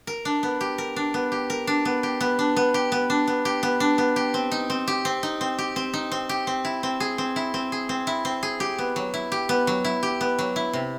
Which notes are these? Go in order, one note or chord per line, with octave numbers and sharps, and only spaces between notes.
A#4
D4
B3
G4
A#4
D4
B3
G4
A#4
D4
B3
G4
B3
D4
B3
G4
B3
D4
B3
G4
B3
D4
B3
G4
C4
D#4
C4
G4
C4
D#4
C4
G4
C4
D#4
C4
G4
C4
E4
C4
G#4
C4
E4
C4
G#4
C4
E4
C4
G#4
G4
B3
F#3
E4
G4
B3
F#3
E4
G4
B3
F#3
E4
C3